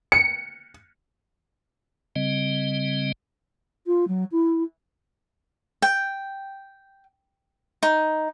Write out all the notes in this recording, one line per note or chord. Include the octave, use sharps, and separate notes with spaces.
C#7
C#3 G3 C4 D#5
F4
F#3
E4
G5
D#4